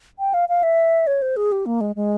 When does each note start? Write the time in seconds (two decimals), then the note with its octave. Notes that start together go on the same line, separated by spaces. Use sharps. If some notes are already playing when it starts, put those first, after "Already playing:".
0.19 G5
0.34 F5
0.49 F5
0.63 E5
1.07 C#5
1.22 C5
1.37 G#4
1.52 G4
1.66 A#3
1.81 G#3
1.96 G#3